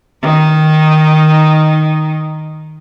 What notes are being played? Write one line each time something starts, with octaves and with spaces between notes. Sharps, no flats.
D#3 D#4